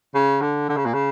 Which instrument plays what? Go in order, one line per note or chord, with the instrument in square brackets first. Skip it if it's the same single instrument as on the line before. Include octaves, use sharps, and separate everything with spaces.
[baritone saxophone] C#3
D3
D3
C#3
A#2
C#3